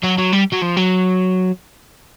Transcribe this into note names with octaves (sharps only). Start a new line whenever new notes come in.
F#3
F#3
G3
F#3
F3
F#3